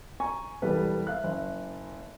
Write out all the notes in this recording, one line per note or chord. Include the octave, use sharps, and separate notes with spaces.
G#5 A#5 C#6
E1 C2 G3 A4 B4
E5 F5 F#6
F#1